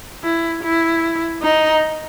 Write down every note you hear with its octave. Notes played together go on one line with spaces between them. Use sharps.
E4
E4
D#4